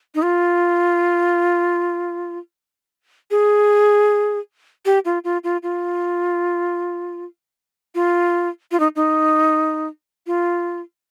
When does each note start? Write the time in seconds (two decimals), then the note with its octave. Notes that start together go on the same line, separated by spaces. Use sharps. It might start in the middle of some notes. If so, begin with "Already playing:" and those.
0.15 D#4
0.22 F4
3.31 G#4
4.86 G4
5.05 F4
5.24 F4
5.44 F4
5.63 F4
7.95 F4
8.72 F4
8.80 D#4
8.96 D#4
10.27 F4